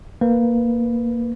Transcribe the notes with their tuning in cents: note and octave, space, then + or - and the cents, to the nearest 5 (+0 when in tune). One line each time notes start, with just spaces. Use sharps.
A#3 +0 B4 +0